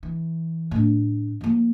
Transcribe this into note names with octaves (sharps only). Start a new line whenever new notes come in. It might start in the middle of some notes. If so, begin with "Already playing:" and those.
E3
A2 D4
F3 A#3